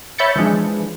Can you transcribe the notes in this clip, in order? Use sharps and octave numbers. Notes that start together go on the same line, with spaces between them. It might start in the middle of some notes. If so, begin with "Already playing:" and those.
C#5 E5 B5 G6 A6 C#7
E3 F3 G#3 D4